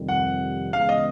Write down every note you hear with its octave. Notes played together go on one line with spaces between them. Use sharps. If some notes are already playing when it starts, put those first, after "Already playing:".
Already playing: F2 C3 D#3 G3
F#5
C#3 E3 G#3 B3 F5
D#5